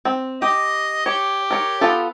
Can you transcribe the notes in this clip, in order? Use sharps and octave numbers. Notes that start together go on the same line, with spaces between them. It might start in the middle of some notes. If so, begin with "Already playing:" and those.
C4
G4 D#5
G4 C#5
A#4 C#5
B3 F4 A4